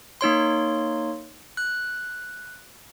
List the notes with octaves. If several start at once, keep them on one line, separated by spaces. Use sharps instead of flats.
A#3 D#4 C#5 C6
F#6